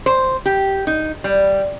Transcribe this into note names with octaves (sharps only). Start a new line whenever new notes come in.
C5
G4
D#4
G3